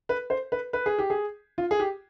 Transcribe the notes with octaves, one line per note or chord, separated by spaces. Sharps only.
B4
C5
B4
B4
G#4
G4
G#4
F4
G#4
G4